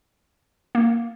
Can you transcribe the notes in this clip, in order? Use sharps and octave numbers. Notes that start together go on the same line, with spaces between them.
A#3